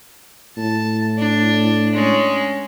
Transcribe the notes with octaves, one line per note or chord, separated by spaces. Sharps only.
A2 A5
D4
G#3 C#4